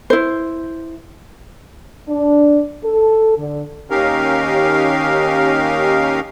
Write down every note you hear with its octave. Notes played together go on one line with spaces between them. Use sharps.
E4 C5
D4
A4
D3
D#2 C#4 D#4 G4 A#4 F5